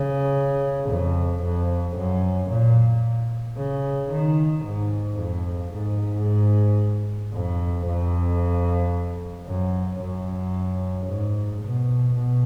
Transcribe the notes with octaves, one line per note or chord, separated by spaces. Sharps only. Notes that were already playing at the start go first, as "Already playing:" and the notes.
Already playing: C#3
F2
F2
F#2
A#2
C#3
D#3
G#2
F2
G#2
F2
F2
F#2
F#2
G#2
B2
B2